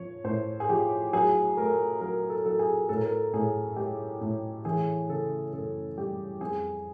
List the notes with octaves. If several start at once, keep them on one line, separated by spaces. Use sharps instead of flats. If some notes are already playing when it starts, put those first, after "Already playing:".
Already playing: F3 C#5
A2 C5
G#4
F3 G4
F#3 G#4
A3 A#4
F#3 A#4
A4
A#4
F#3 A4
G#4
A2 A4
A#4
A4
A2 G#4
G#3 G4
A2
E3 G#4
C#3 A4
F#2 A4
G3 G4
F2 G#4